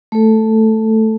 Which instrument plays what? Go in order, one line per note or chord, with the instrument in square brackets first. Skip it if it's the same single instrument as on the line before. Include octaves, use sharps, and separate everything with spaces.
[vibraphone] A3 A4